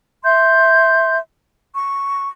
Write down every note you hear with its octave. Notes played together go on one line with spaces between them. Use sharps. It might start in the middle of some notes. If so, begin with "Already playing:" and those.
E5 C6 G6
C#6